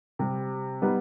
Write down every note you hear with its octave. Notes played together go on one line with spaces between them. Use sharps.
C3 G3 C4
G3 B3 D#4 B4